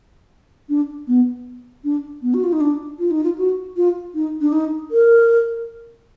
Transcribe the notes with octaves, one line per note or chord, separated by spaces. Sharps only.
D4
B3
D4
B3
F#4
F4
D#4
D4
F4
D#4
F4
F#4
F4
D#4
D4
D#4
A#4